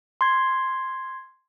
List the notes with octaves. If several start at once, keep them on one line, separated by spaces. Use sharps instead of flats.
C6 G#6